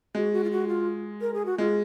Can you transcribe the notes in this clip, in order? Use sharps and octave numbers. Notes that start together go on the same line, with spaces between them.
G#3 F#4
F#4
F4
F#4
F4
A#4
G#4
F#4
G#3 F4